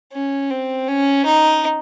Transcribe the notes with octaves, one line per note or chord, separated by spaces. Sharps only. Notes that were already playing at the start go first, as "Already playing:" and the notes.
C#4
C4
C#4
D#4